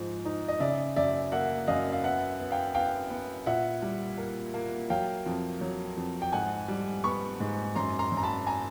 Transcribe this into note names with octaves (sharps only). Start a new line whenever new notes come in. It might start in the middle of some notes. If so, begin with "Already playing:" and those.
Already playing: G#2 F3
D#4
D#5
C#3 D5 E5
F#2 D5 E5
A#3 E5 F#5
F#2 D#5 F5
F5
B3 E5 F#5
B3
F5 G5
B3 F5 G5
B3
A#2 E5 F#5
G3
A#3
A#3
F#3 F5 G5
F2
F#3
F2
G5
G#2 F#5 G#5
G3
B3 B5 C#6
G#2
F#2 A#5 C6
A#5 C6
F#2
A#5
A5 B5
G#5 A#5